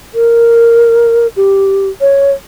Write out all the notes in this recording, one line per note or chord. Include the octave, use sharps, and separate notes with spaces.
A#4
G4
C#5